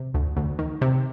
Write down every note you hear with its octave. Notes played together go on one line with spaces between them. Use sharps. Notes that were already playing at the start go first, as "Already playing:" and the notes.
Already playing: C3
D2
D2
D#3
C3